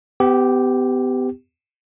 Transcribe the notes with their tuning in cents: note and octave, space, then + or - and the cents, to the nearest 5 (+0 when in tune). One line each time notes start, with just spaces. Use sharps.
B3 +35 G4 +0